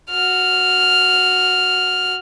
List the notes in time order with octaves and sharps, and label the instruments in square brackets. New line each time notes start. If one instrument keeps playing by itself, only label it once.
[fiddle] F#4 F6